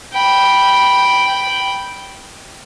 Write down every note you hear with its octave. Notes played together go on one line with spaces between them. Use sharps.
G5 B5